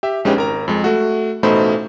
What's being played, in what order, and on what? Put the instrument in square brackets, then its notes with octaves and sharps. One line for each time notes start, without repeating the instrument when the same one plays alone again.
[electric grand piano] G4 E5
A#1 G#3 C#4 D#4 G4 B4
G#1 A#4 A#5
F2 G#3
A3 F#4
A1 B2 A3 D#4 C5 B5